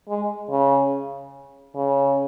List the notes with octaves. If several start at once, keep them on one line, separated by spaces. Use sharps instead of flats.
G#3
C#3
C#3